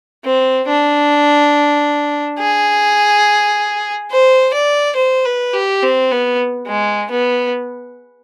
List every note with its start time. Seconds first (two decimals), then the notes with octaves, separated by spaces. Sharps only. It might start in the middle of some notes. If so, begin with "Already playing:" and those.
0.25 C4
0.68 D4
2.39 G#4
4.11 C5
4.54 D5
4.96 C5
5.25 B4
5.54 G4
5.83 C4
6.12 B3
6.68 G#3
7.11 B3